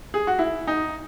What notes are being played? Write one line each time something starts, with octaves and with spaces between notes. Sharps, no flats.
G#4
F#4
E4
D#4